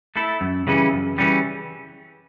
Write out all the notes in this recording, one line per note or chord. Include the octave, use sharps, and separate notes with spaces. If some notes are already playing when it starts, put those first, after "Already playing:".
A3 E4 A4
F#2
C#3 E3 G3 C#4
F#2
C#3 E3 G3 C#4